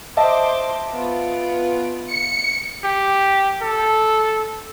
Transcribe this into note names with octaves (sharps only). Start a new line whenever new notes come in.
C5 D#5 E5 A5 D6
B3 F4 D7
C#7
G4
A4